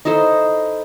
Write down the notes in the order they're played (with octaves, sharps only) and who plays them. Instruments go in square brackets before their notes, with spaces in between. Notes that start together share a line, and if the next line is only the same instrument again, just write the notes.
[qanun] D#4 E4 A4 C5